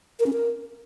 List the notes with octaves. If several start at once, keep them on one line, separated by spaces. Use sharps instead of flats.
A#4
C#4
A#4